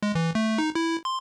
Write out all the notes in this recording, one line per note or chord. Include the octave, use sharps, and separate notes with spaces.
G#3
E3
A3
D#4
E4
C6